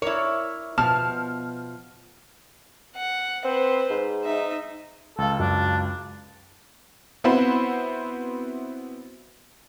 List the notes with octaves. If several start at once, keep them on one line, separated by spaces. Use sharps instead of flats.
E4 A#4 C#5 D5
B2 F3 B3 A5 F6
F#5
C4 B4 C5
G#2
D#4 E5
C#2 A4 F5
F#2 D4
B3 C4 E4 F#4 C5 B5